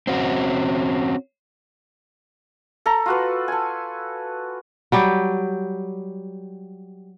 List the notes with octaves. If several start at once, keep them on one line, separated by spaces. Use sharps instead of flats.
C4 C#4 F#4
A4 A#5
F4 F#4 B4
A4 G#5
F#3 G3 G4